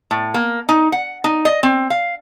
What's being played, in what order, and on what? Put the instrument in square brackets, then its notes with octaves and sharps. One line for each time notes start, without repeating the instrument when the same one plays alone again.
[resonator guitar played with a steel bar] A2
A#3
D#4
F#5
D#4
D#5
C4
F5